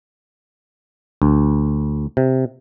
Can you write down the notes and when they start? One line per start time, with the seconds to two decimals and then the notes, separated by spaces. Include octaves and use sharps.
1.22 D2
2.17 C3